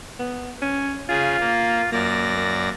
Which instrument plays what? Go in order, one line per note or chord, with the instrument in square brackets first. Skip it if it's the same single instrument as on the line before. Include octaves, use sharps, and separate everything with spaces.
[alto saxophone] B3
C#4
[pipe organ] C#3 G#4 [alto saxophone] F4
[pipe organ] A#3
[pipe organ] F#2 D5 A#6 [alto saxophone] A#3
[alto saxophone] A#3